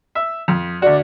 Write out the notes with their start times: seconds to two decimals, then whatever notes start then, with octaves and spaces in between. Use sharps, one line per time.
0.15 E5
0.48 F2
0.82 D2 F#4 D5